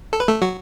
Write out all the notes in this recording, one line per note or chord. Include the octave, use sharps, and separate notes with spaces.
A4
B4
A3 A4
F#3 F#4